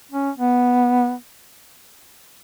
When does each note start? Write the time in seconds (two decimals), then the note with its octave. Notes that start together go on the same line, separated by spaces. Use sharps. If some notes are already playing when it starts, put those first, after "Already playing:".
0.11 C#4
0.38 B3